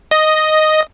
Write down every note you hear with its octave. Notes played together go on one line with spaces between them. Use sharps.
D#5